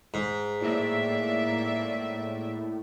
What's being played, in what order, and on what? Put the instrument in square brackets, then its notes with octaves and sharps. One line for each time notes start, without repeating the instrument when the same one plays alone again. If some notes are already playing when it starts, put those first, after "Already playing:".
[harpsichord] G#2
[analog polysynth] A2 [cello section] A#3 D5 E5